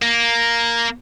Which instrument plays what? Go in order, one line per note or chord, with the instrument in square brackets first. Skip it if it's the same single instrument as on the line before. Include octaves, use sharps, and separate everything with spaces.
[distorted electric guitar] A#3